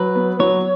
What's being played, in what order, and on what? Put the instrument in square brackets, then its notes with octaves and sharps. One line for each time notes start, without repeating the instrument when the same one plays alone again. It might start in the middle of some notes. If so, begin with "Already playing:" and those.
Already playing: [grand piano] F#3 [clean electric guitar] B4
[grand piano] B3
[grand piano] F#3 [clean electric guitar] C#5